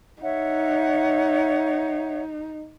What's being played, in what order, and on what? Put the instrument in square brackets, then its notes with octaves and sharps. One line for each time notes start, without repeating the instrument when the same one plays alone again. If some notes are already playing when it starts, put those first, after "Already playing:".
[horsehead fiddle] D#4 [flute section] C#5 E5 F#5